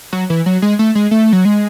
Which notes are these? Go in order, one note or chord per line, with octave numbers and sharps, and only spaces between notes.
F#3
E3
F#3
G#3
A3
G#3
A3
F#3
G#3